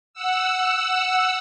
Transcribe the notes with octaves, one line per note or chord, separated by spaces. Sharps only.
F#5 E6